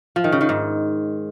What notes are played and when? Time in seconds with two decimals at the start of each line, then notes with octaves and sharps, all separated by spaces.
0.16 F3
0.24 D#3
0.32 C#3
0.41 D#3
0.49 G#2